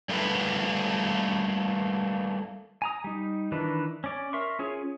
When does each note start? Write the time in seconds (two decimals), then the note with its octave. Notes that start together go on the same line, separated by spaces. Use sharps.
0.09 G3 A3 A#3 A4 B4
2.82 G#5 A#5 D#6
3.04 G3 D#4
3.52 D#3 E3 D4 B4
4.04 C#4 D5
4.33 A#4 E5 C6 C#6
4.59 C#4 F4 G#4 C#5